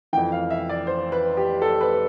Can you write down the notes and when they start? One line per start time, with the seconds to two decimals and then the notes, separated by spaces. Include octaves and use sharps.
0.13 E3 G5
0.17 F2
0.32 F5
0.50 E5
0.69 D5
0.87 C5
1.12 B4
1.37 G4
1.62 A4
1.81 B4